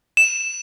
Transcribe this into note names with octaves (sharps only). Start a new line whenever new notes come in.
E7